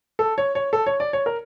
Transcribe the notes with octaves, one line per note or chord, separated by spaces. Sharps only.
A4
C#5
C#5
A4
C#5
D5
C#5
A#4